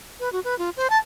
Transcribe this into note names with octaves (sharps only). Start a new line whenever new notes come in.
B4
F#4
B4
F4
C5
A5